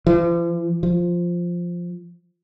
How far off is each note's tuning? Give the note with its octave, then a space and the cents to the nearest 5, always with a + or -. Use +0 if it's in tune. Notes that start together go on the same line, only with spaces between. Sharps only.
F3 -45
F3 +0